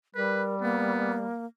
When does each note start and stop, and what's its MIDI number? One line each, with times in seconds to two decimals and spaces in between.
0.15 1.31 55
0.15 0.55 70
0.15 0.43 71
0.61 1.46 58
0.61 1.18 59